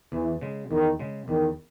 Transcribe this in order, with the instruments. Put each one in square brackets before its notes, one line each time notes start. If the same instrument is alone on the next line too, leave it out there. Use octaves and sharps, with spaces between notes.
[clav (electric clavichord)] E2 [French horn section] E3
[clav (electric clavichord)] C#3 G#3
[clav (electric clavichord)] E2 [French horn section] D#3
[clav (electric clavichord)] C#3 G#3
[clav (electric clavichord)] E2 [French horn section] D#3